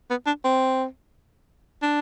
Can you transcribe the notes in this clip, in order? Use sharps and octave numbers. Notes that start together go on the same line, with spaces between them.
B3
D4
C4
D4